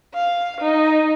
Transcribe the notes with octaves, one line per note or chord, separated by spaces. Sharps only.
F5
D#4